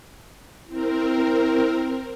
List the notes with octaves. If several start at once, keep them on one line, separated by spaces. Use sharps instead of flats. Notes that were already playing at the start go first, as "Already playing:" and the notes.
C4 E4 A#4